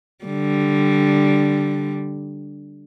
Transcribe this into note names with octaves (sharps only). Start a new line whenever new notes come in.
D3 G3